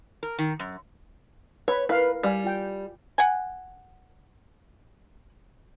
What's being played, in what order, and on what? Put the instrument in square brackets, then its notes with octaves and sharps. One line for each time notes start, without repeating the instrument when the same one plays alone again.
[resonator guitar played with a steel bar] A#4
D#3
F#2
[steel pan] B4 B5 [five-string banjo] C#5
[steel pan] E4 A#4 F5 [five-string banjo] B4
[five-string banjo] G3 [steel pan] F5 G#5
[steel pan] F4 G5
[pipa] F#5 G#5